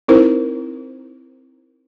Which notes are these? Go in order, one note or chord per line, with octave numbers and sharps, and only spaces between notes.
C4 D#4 E4 A#4 C5